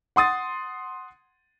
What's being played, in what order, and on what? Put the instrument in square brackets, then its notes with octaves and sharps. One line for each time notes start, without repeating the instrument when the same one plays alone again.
[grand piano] F#5 C6 D#6 A6